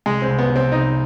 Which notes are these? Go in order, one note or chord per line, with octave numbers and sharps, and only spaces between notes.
C2 G#3
C4
C2
B3
C3
C4
C2 D#4